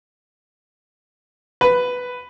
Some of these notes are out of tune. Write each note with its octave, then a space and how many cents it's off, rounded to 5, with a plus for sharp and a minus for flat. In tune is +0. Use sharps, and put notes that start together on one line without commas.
B4 +5